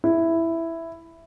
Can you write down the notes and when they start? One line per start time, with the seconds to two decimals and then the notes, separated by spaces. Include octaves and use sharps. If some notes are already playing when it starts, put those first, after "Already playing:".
0.04 E4